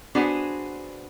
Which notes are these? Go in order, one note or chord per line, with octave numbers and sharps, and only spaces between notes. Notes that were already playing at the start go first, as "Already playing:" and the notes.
B3 D4 F#4 G#4 C5